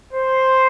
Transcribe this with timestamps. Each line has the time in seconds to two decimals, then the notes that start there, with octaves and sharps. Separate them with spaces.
0.13 C5